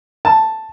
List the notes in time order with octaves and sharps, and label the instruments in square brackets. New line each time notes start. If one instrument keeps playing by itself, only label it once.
[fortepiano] A5